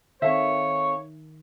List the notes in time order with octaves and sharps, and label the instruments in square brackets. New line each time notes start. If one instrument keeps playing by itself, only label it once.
[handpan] D#3 [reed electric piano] C4 A4 F5 [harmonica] C#5 [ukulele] E5